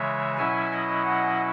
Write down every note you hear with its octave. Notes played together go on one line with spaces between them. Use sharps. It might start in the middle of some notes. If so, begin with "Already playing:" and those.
Already playing: C#3 E3 G#3 C#5 E5
B2 F#3 C#4 E4 E5 G#5
D#5 F#5
D#5 F#5